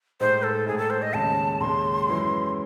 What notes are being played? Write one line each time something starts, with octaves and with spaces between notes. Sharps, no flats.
A2 G#3 D#4 C5
A4
A2 G#3 D#4 G#4
A4
C5
D#5
D#2 C#3 G#3 C#4 G#4 A5
D#2 C#3 G#3 C#4 G#4 C6
F#2 E3 G#3 C#4 E4